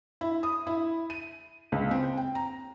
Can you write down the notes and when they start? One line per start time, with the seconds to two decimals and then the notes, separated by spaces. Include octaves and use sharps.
0.21 E4
0.43 D#6
0.67 E4
1.10 D#7
1.72 C#2
1.91 C4
2.17 G5
2.35 A#5